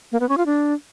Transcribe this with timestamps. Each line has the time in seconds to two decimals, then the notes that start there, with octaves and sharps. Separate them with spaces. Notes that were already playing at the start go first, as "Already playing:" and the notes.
0.12 A#3
0.20 B3
0.29 C#4
0.37 F4
0.46 D4